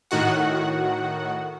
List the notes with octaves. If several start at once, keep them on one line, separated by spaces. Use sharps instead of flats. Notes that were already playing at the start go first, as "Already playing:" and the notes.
A2 D#3 F#4 F#5